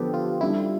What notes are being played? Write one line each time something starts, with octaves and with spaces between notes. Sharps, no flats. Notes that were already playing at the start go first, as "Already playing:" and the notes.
Already playing: D3 F3 B3 G4 A4
F4
G3 D4 E4 G4